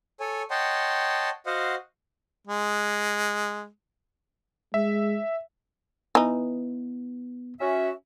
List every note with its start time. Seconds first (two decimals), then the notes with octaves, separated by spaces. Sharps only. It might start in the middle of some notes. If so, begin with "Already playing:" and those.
0.20 A4 C#5 G#5
0.51 C#5 D#5 F#5 G5 A5 C6
1.46 F#4 C5 D#5 F5 F#5
2.47 G#3
4.74 G#3 E5
6.15 E3 B3 D#4
7.60 C#4 F#4 E5